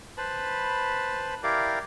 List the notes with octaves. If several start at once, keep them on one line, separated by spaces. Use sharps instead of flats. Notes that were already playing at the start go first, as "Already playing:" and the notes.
B4 C5 A5 B5
E4 G4 A#4 D5 F5